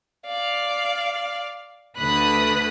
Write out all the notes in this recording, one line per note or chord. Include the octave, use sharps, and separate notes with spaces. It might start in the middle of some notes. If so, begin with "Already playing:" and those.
D5 F5
D2 D3 B4 B5 D#6 F#6